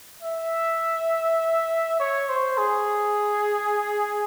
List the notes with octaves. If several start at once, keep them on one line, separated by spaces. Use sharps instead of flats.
E5
C#5
C5
G#4